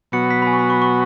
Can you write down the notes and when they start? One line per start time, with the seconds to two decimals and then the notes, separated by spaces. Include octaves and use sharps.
0.12 B2 F#3 B3 F#4 C#7
0.31 B6
0.42 B5
0.47 G#5
0.53 C#6
0.59 B5
0.70 C#6
0.82 C#6